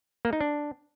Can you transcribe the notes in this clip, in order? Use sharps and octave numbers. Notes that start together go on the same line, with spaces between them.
A#3
D#4
D4